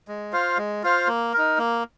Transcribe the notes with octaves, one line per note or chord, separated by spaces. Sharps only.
G#3
F4 C5 F5
G#3
F4 C5 F5
A#3
D#4 A#4
A#3